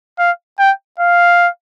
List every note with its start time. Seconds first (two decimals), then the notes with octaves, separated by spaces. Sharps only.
0.19 F5
0.59 G5
0.99 F5